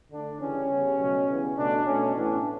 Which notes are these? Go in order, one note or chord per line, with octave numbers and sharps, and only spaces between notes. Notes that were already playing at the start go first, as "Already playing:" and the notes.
D3 A3 D4
C#3 E3 G3 C#4
C#3 G3 B3
B2 F#3 A3
C#3 E3 G3 B3
B2 A3 D4
B2 A3 C#4
A2 E3 B3 D4